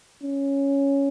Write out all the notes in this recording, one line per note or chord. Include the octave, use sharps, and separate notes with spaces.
C#4